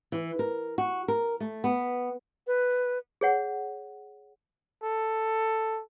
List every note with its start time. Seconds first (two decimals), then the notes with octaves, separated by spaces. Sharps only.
0.12 E3
0.39 A#4
0.78 F#4
1.08 A#4
1.40 A3
1.64 B3
2.47 B4
3.21 G#4 C#5 F#5
4.83 A4